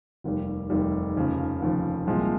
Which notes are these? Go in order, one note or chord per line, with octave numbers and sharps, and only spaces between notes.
F1 D#2 D#3 G3
F1 D#2 D#3 G3
F1 D#2 C#3 F3
F1 D#2 C#3 F3
C2 A#2 F3 G#3 C4